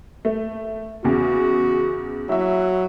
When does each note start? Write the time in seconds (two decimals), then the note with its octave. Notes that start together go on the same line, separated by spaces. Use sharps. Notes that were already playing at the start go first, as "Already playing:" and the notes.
0.25 A3
1.04 E2 C#3 F#4
2.29 F#3 E4 F#4 E5